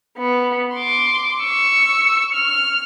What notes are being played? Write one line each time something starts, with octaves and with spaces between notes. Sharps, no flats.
B3
C6 D6
C#6 E6
F6